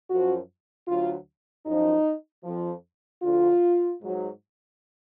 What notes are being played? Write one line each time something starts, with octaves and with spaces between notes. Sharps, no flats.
F#2 F3 F#4
D2 D3 F#3 F4
F#2 F3 D#4
F2 F3
D2 D3 F3 F4
G#2 F#3